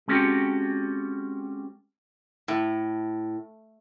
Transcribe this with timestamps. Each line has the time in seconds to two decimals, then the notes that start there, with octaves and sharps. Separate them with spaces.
0.08 G#3 C4 C#4 F#4 G4 A4
2.48 A2